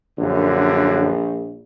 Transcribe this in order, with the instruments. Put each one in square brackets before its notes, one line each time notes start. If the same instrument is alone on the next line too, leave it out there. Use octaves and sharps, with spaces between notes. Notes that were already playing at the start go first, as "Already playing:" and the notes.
[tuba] A#1 [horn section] F#2 D3